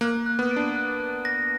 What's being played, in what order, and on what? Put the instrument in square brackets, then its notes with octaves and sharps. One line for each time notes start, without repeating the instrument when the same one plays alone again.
[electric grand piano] A#3 [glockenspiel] F#6
[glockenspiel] F#6
[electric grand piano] B3
[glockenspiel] D7
[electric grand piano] D4
[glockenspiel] F#6
F#6
A#6